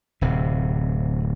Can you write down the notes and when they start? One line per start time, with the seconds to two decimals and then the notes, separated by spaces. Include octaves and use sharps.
0.21 D1 C3